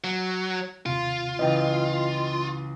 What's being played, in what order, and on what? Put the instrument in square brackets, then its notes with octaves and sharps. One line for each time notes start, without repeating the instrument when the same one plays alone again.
[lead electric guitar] F#3
[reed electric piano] D#2 C3 [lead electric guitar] F4
[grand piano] C#2 E3 [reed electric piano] D#5 G5